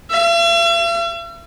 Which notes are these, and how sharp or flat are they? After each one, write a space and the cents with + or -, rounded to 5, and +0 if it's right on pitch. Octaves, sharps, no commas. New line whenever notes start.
E5 +45